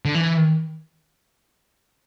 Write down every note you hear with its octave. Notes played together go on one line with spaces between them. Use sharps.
D3
E3